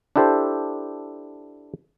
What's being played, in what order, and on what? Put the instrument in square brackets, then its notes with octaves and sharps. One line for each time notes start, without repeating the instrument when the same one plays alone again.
[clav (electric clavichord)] D4 E4 G4 A4 C5